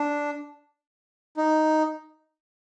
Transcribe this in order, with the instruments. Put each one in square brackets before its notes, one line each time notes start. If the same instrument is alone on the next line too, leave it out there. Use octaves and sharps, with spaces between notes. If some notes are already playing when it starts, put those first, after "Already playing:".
Already playing: [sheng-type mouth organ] D4
D#4